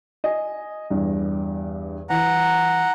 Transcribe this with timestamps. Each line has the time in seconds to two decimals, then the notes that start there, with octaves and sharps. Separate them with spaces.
0.24 D#5 G#5
0.90 E2 G2
2.10 E3 F#5 A#5